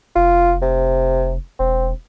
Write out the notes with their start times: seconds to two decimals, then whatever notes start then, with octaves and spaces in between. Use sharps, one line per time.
0.16 F1 F4
0.62 C3
1.59 E1 C4